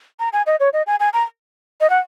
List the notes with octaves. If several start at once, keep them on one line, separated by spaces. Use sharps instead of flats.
A#5
G#5
D#5
C#5
D#5
G#5
G#5
A#5
D#5
F#5